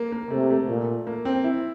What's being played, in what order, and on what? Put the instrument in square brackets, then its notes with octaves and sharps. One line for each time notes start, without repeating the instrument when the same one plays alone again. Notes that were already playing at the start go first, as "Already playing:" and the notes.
Already playing: [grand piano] A#3
A#3
[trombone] C3 [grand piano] A3
[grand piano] A3
[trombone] A#2
[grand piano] A#3
C4
E4